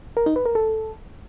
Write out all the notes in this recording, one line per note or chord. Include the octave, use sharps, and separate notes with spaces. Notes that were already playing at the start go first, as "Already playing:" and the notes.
A#4
D#4
B4
A#4
A4